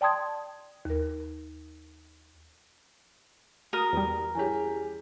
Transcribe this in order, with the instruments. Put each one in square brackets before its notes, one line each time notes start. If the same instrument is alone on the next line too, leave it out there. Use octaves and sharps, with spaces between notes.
[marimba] D5 G5 A5 C6 D#6 G#6
D#2 A#4
[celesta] F#4 [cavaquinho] A#4 [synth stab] D#6
[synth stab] E2 G3
[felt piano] E3 C#4 G4 [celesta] G#4 G#5